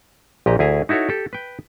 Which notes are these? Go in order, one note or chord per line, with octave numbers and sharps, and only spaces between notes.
A#1 A#2 G4 D#5 A#5
D2 E4 G#4 G#5 A#5
D#4 E4 F#4 A4 C#5
G4 A4
B4 G5